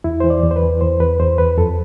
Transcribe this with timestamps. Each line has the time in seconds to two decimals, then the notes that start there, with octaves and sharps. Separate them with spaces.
0.04 E2 E4
0.20 E3 C5
0.30 D5
0.43 E2
0.51 C5
0.56 B4
0.63 E3
0.81 E2 C5
1.00 E2 B4
1.20 E2 C5
1.38 E2 B4
1.57 F2 A4